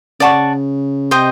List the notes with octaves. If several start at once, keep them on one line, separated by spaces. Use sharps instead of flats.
C#3 D5 F#5 A5 C#6
C3 C5 D#5 G5